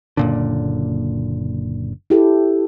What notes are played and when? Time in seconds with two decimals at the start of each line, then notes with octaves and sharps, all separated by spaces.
0.17 F#1 A#2 D3
2.10 E4 G4 A4